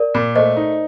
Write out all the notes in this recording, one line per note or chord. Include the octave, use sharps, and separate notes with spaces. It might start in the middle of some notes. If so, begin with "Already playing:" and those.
Already playing: A#4 D5
A#2
A3 C5 D#5
D#4